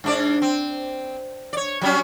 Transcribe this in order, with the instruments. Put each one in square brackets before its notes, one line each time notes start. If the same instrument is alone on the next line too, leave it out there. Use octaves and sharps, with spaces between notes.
[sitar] G#2 D4 D5
C4
C#5 D5
F#3 G3 C#4